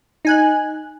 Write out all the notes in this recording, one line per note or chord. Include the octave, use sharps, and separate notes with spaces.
D#4 G#5 F#6